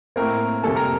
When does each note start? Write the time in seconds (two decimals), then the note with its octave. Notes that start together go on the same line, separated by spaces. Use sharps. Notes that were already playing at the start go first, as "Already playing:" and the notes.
0.16 A2 A3 A#3 C4 A#4
0.63 F2 C3 G3 A#3 A4 A5
0.75 A#4 A#5